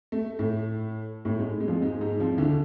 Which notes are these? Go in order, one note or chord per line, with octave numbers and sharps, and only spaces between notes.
A3
A2 A3
A2 A3
G#2 G#3
G#3
F2 F3
G#2 G#3
G#2 G#3
F2 F3
E3
D2 D3
D3